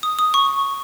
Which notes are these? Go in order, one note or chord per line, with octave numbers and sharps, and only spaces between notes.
D#6
D#6
C#6